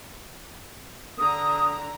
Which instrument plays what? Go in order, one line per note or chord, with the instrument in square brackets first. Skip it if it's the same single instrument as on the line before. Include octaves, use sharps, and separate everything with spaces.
[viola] D3 A#5 [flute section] D#6